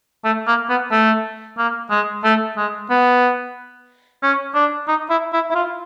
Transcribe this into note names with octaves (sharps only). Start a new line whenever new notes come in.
A3
A#3
B3
A3
A#3
G#3
A3
G#3
B3
C#4
D4
D#4
E4
E4
E4
F4